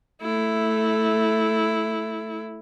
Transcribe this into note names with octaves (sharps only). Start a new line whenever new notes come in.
A3 E4